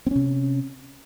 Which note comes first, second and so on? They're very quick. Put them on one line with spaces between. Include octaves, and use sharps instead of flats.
C4 C#4 C3